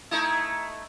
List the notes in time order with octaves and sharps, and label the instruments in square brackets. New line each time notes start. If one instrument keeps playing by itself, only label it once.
[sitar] A3 D#4 E4